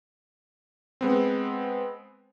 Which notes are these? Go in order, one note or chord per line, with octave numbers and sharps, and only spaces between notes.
G#3 B3 C4